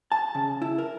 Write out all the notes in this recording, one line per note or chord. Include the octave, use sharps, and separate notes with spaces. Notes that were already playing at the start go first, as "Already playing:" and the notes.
A5
C#3
E4
A#4